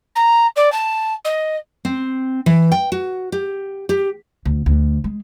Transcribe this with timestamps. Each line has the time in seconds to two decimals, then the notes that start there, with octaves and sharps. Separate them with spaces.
0.16 A#5
0.56 D5
0.72 A5
1.25 D#5
1.85 C4
2.46 E3
2.72 G5
2.92 F#4
3.32 G4
3.89 G4
4.45 D2
4.66 D2
5.04 G#3